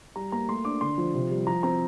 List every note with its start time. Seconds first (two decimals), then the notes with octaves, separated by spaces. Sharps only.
0.16 G3 A#5
0.32 A#3 A#5
0.48 A3 C6
0.65 D4 D6
0.81 D3 C6
0.98 F3
1.14 C3
1.31 G3
1.47 F3 A#5
1.63 C4 A#5